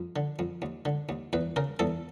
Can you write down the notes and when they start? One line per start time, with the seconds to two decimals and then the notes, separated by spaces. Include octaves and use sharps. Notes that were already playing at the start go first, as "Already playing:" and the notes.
Already playing: F2
0.16 D3
0.39 F2
0.62 D#2
0.85 D3
1.09 D#2
1.33 E2 B4
1.56 C#3 A#4
1.79 E2 A4